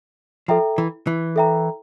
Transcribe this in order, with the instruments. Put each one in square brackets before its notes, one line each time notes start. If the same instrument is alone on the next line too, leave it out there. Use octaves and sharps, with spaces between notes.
[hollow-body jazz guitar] F3 [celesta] A4 E5 G5 A#5
[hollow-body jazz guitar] E3
E3
[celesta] A4 E5 G5 A#5